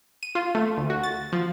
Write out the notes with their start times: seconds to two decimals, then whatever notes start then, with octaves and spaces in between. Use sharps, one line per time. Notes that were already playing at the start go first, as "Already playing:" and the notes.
0.23 D#7
0.35 F4
0.55 A3
0.78 D2
0.90 F#4
1.03 A6
1.33 F3